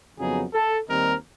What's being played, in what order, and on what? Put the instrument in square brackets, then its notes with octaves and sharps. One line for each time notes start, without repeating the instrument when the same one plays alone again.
[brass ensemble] F2 C#3 F#3 B3 D#4 G#4
A4
D#2 D#3 G3 C4 D#4 A#4